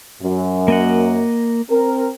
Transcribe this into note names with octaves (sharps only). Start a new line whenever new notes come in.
F#2
A#3 D#5 F#5
C4 A#4